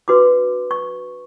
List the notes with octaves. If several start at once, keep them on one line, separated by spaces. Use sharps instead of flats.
D4 F#4 B4 C6 D6
C#6